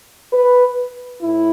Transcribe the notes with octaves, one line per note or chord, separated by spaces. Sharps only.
B4
A2 E4